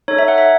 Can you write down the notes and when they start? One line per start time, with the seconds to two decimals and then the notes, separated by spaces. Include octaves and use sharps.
0.08 D#4 A4 C#5
0.19 E5
0.28 F#5
0.38 E5